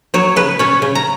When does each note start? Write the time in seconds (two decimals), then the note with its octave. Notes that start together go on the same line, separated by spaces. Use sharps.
0.14 F#3 C#5
0.36 C#3 B4
0.59 C#4 C#5
0.82 C#3
0.95 A#5